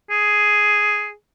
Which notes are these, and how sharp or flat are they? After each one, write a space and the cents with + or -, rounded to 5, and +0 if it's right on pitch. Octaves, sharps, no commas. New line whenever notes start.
G#4 +5